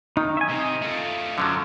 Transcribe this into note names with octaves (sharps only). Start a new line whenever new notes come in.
D#3 D#4
E5 G#5
C3 D#5
A3 F4
F#2 D3 F3 F#3